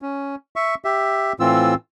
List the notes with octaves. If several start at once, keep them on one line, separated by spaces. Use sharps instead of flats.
C#4
E5 C#6
G4 E5
A2 E3 C4 F4 E6